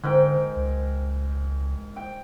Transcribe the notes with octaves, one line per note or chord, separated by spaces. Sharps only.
G#2 D3 A#4 G5
C#2
G5